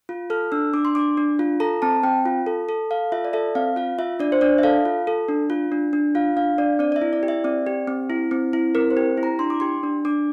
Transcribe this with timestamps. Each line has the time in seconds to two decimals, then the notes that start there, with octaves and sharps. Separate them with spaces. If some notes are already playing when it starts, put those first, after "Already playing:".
0.09 F4
0.30 A4 F6
0.52 D4 E6
0.74 D4 D6
0.85 C6
0.95 D4 D6
1.17 D4
1.39 F4
1.60 A4 A#5
1.82 C4 A5
2.03 C4 G5
2.26 F4
2.46 A4
2.69 A4
2.91 A4 F5
3.12 F4 E5
3.25 D5
3.33 A4 E5
3.55 C4 F5
3.76 F4 F5
3.99 F4 E5
4.19 D4 D5
4.32 C5
4.41 D4 D5
4.58 E5
4.63 A4 F5
4.85 F4
5.07 A4
5.28 D4
5.50 F4
5.72 D4
5.93 D4
6.15 F4 F5
6.37 D4 F5
6.58 D4 D5
6.79 C4 D5
6.92 D5
6.96 E5
7.01 E4
7.13 D5
7.23 G4
7.28 E5
7.44 C4 D5
7.67 G4
7.87 C4
8.10 E4
8.31 C4
8.53 E4
8.75 C4 A#4
8.90 C5
8.97 G4
9.17 E4
9.23 A#5
9.39 D4 C6
9.50 D6
9.60 G4 C6
9.83 D4
10.05 D4 D6